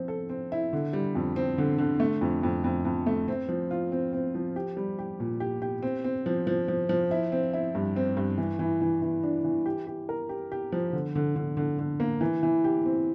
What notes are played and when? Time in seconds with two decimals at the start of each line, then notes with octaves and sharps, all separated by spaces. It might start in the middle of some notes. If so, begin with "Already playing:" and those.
Already playing: F3 C4
0.08 A4
0.29 C4
0.52 E4
0.73 D3
0.93 G3
1.15 F2
1.36 C4
1.58 D3
1.78 D3
2.00 A3
2.21 F2
2.43 F2
2.64 F2
2.85 F2
3.07 A3
3.28 C4
3.49 F3
3.71 F4
3.92 C4
4.13 C4
4.35 F3
4.56 G4
4.77 G3
4.99 G4
5.20 A#2
5.40 G4
5.62 G4
5.82 C4
6.04 C4
6.26 F3
6.47 F3
6.68 F3
6.89 F3
7.11 E4
7.32 C4
7.54 E4
7.75 G2
7.96 C4
8.17 G2
8.38 E3
8.59 E3
8.82 E3
9.02 E3
9.23 D4
9.44 E3
9.66 G4
9.87 G4
10.09 A#4
10.29 G4
10.52 G4
10.72 F3
10.93 D3
11.15 D3
11.36 D3
11.57 D3
11.79 D3
12.00 A#3
12.21 E3
12.43 E3
12.64 G4
12.85 C4